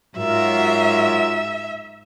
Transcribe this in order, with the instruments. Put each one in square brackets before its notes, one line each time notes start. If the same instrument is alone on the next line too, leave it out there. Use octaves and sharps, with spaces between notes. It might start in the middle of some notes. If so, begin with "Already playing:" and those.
[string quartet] G#2 [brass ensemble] F#3 F4 A#4 [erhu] E5